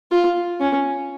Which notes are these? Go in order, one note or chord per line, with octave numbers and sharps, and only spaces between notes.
F4
C#4